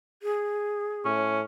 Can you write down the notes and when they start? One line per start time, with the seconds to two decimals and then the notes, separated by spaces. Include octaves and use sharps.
0.23 G#4
1.05 A2 C#4